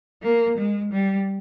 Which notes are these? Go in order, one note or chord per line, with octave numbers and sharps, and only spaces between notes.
A#3
G#3
G3